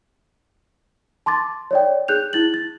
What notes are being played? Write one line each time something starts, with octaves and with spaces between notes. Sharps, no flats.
A5 C6 D6 A6
C#5 D5 G5
G#4 F#6 G6 F7
E4 A6 F#7
A6